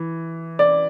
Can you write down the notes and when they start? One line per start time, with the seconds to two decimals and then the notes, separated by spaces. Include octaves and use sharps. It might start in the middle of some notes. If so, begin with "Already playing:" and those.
Already playing: E3
0.59 D5